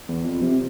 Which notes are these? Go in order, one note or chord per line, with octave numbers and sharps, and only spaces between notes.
E2
F2
C3